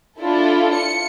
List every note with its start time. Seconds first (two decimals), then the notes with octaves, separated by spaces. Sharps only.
0.20 D4 E4 F4 A4
0.74 C#7